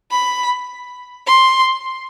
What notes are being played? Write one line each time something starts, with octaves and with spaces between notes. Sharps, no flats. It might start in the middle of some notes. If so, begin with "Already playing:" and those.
B5
C6